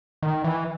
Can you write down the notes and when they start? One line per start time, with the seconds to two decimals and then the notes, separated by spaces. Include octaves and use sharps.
0.23 D#3
0.44 E3